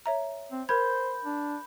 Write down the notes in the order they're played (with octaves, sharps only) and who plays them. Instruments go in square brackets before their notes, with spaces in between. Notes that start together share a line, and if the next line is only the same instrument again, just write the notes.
[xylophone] C#5 E5 A#5
[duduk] C4
[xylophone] A#4 G#6 [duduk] C5 [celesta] B5 G6
[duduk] D4